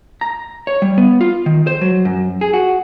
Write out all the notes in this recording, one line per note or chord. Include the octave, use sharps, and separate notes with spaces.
A#5
C#5
G3
B3
F4
D#3
C5
F#3
F#2
G#4
F#4